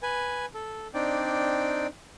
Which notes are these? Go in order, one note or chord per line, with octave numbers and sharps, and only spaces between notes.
B4 G#5
A4
C4 D4 D#4 D5 G5